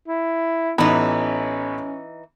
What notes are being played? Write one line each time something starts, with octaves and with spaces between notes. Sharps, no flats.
E4
A1 E3 B3 C#4 D#4 B5